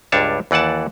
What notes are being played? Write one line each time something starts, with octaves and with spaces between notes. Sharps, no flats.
C#2 G2 G3 D4 C#5 A5
D#2 E3 D5 F#5 A5